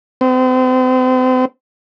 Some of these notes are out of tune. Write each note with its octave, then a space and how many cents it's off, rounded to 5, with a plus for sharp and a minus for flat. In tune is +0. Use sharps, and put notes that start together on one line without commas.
C4 -35